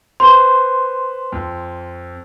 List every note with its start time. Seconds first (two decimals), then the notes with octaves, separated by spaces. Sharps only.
0.20 B4 C5 C6
1.32 F2